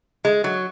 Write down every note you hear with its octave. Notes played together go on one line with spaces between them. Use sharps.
G#3
F#3